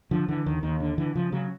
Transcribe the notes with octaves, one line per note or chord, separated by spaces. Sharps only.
D3 F3
D3 E3
D#2 D#3
D#2 D#3
D3
D3 E3
C#3 F3
C#3 F#3